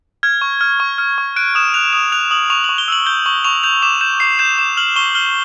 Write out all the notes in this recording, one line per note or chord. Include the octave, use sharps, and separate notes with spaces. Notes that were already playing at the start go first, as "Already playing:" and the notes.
F6 G#6
C#6
F6
C#6
F6
C#6
F#6 D7
D#6 E7
F#6 F7
D#6 E7
F#6 F7
D#6 F#7
C#6 F7
C#6 F#7
G7
E6 F#7
G6 G7
C#6 F#7
C#6 F7
G6 F7
D6 E7
G6 E7
D6 C7
G6 E7
D6 E7
F6 F#7
C#6 G7
F6 G7